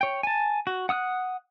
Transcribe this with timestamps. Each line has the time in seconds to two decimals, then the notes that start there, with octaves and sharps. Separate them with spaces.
0.01 C#5 G5
0.23 G#5 A5
0.67 F#4
0.89 F#5 D#6 E6 F#6